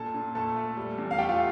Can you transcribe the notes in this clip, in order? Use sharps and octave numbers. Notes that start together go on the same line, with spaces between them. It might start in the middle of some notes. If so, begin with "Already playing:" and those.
Already playing: A#2 A4 A5
A#2
A3 A4 A5
A3
G3
E2
F5
A3 G4 G5
F4 F5